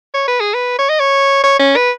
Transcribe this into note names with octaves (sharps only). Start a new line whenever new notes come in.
C#5
B4
G#4
B4
C#5
D#5
C#5
C#5
C#4
B4